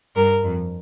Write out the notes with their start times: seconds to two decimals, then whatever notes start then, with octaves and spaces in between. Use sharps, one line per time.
0.16 G2 A#4
0.45 F2